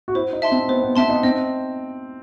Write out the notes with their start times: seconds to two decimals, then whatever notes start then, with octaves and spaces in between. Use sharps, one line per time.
0.08 F#4
0.15 E4 C5
0.33 D#4
0.42 E5 A5 C6
0.52 C4
0.68 B3 C5
0.82 B3
0.96 C4 E5 A5 C6
1.09 D#4
1.23 C4 D#5